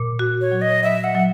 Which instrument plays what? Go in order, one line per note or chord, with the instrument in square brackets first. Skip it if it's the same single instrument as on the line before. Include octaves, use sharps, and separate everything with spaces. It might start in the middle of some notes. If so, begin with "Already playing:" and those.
Already playing: [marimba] A#2
F#4
[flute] C#5
[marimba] F#3
[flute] D#5
[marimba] F#3 [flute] E5
[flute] F#5
[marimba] F#3